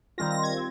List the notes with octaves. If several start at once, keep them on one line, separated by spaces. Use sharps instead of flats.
D#3 G3 C4 F4 A#6
A#6
G#6
C4